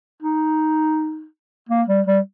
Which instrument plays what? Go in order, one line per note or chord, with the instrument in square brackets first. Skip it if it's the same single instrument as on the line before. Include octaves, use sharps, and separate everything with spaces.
[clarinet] D#4
A#3
G3
G3